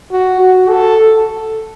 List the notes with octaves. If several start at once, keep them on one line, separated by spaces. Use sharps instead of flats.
F#4
F#4
A4